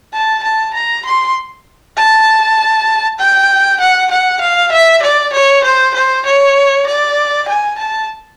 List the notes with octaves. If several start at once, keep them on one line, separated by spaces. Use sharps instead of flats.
A5
A5
A#5
C6
A5
G5
F#5
F#5
F5
E5
D5
C#5
C5
C5
C#5
D5
G#5
A5